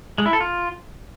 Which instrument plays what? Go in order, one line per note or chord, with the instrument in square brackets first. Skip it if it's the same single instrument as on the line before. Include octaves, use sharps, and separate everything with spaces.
[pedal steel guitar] G#3
E4
A4
F4